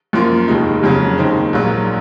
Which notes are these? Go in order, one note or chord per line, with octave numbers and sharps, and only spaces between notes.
F#2 F3 A#3 F4
F1 D#2 D#3 G#3 D#4
F#1 F2 C#3 F#3
D#2 D#3 G#3 C4 D#4
A#1 G#2 F#3 A#3